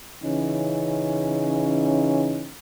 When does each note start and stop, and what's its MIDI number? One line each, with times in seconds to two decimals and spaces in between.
0.23 2.52 49
0.23 2.52 52
0.23 2.52 61
0.23 2.52 63